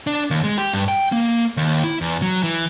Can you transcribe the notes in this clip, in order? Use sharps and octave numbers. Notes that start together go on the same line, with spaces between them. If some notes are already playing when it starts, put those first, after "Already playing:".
D4
D#2
G#3
G4
G2
G5
A#3
D#2
E4
E2
F#3
E3